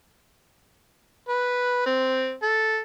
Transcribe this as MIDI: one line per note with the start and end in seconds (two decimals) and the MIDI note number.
1.29 1.85 71
1.86 2.34 60
2.42 2.80 69